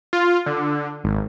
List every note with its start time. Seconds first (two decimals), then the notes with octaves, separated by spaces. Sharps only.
0.13 F4
0.46 D3
1.04 G#1